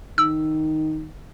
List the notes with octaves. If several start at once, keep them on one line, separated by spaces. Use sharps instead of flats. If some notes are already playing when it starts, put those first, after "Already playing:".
D#3 E6